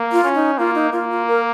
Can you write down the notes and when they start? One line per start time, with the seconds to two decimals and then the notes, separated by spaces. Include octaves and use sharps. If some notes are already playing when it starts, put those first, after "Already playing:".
Already playing: A#3
0.12 F4
0.24 C#4
0.35 D#4
0.58 A#3 F4
0.75 D#4
0.92 A#3 F4
1.10 F4
1.28 A#4